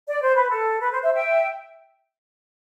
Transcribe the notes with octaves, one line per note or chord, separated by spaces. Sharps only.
D5
C5
B4
A4
B4
C5
C5 E5
E5 G5